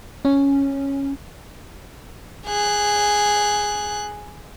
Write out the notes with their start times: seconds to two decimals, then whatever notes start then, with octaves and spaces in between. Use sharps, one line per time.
0.25 C#4
2.46 G#4 F#6